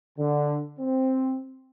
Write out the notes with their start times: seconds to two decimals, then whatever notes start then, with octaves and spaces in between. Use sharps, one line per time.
0.18 D3
0.80 C4